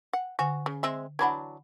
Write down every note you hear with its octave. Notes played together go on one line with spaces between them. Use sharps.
F#5
D3 F#4 G#5
C#3
G#3 C4 E5
E3 F#3 D4 F#5 B5 G#6